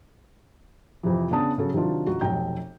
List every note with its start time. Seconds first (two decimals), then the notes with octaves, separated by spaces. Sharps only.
1.03 F2 C3 E3
1.31 C#3 B3 D4 A5 D#6
1.58 C#3 F#3 A4
1.73 C3 D#3 F#3 D4 F4
2.07 C#2 F#4
2.21 F1 B1 G5 A#5 G6